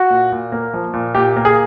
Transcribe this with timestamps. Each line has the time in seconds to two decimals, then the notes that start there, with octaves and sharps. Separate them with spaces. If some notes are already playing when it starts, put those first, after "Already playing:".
Already playing: F#4
0.10 A#2
0.32 A#2
0.52 A#3
0.74 F3
0.93 A#2
1.15 A#2 G4
1.36 A#3
1.45 G#4